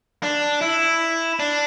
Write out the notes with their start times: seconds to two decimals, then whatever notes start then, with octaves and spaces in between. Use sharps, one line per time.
0.23 D4
0.62 E4
1.39 D4